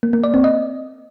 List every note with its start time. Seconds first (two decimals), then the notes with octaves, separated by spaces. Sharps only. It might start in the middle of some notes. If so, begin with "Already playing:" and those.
0.03 A#3
0.13 A#3
0.24 D5
0.34 C4
0.44 D#5